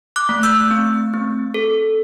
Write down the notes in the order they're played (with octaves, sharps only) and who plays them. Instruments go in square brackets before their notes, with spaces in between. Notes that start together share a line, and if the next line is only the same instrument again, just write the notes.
[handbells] D6 F#6
A3
E6 G6
C4
C4
A4